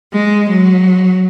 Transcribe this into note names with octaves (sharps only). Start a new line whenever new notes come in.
G#3
F#3